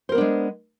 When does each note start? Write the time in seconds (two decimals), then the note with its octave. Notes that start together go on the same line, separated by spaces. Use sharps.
0.09 C5
0.12 A#4
0.15 B3
0.18 D4
0.21 G#3